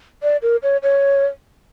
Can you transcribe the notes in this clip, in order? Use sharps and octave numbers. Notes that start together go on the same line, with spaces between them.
D5
A#4
C#5
C#5